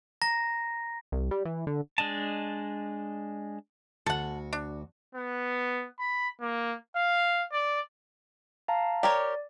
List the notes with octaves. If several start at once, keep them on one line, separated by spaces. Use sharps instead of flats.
A#5 A#6
C2
G3
E3
D3
G#3 D4 D#5 A5
D2 F#4 A4 F#5
D4
B3
B5
A#3
F5
D5
F5 A5 A#5
G4 A#4 C#5 D5